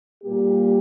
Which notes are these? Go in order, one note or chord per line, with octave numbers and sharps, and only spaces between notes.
A#2 G3 A#3 G4